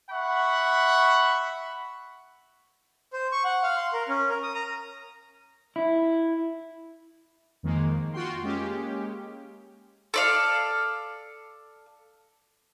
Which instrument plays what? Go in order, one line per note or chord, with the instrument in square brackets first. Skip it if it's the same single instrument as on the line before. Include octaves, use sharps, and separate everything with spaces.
[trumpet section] E5 F#5 B5 C#6
[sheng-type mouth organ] C5
C#6
F#5
F5
C6
A#4
C#4
A#4
D#6
A#5
[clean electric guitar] E4
[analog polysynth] F2 D#3 G#3 A#3
F4 F#4 G5 C6
G#3 A#3 C#4 G4
[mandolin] A4 D5 F5